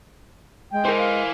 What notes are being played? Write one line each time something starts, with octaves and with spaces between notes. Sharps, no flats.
G#3 G5
E4 A#4 C5 G#5
F5